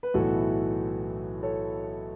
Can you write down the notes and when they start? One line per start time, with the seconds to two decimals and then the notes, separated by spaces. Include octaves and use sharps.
0.03 B4
0.14 B1 A2 E3 F#4 A4
1.43 A4 C#5